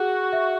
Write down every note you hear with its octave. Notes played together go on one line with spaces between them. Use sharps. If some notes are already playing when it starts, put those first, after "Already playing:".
Already playing: F#4 G#4
E5